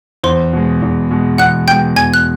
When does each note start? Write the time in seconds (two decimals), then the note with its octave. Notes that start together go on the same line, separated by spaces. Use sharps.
0.24 E2 C5 C6
0.53 B2 G#3
0.82 E2
1.11 B2 G#3
1.38 E2 F#5 F#6
1.68 B2 G#3 G5 G6
1.96 E2 G#5 G#6
2.14 F#6